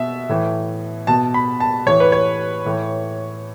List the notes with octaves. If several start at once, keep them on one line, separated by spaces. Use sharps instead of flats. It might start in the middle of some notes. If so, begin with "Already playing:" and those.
Already playing: B2 E5
A2 E3
B2 A5
B5
A5
A2 E3 C#5
B4
C#5
A2 E3